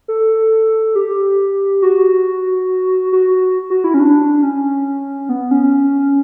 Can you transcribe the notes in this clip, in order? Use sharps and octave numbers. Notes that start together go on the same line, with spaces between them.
A4
G4
F#4
F#4
F#4
E4
C#4
D4
C#4
B3
C#4